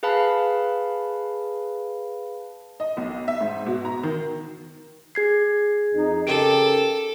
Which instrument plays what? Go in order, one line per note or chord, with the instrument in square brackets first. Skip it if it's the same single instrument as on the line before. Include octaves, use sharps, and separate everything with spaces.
[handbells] G#4 B4 F5 A5 B5
[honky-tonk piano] D#5
B1
E5
G#2
B2
A#5
D#3
[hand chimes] G#4 G#6 C7
[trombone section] F2 D#4
[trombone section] C#3 G4 A#4 [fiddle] A4 [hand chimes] D7